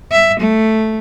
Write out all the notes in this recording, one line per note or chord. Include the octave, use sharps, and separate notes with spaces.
E5
A3